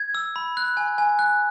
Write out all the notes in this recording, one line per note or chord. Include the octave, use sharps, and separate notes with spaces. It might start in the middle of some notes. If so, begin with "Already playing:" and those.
Already playing: G#6
E6
B5
F#6
G#5
G#5
F#6